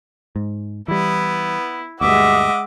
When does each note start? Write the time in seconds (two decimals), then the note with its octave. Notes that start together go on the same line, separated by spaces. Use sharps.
0.36 G#2
0.88 E3 G3 B3 E4
2.01 D2 G2 G#3 D#5 E5 F#5 D6